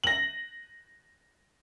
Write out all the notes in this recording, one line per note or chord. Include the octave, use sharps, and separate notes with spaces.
A#6 F#7